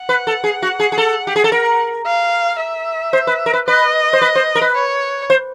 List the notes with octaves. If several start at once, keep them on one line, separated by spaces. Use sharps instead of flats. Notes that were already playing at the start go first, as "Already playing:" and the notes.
Already playing: F#5
B4
A4
G#4
F#4
G#4
G#4
A4
G4
G#4
A4
A#4
F5
E5
C5
B4
A#4
B4
B4 D#5
C5
B4
C5
A#4
B4
C#5
C5